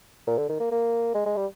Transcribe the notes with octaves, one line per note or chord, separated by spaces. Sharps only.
A#2
D3
D#3
A#3
A#3
G#3
G#3
G3